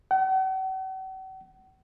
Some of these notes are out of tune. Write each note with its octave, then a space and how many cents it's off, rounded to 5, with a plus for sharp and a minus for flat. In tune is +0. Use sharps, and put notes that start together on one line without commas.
F#5 +45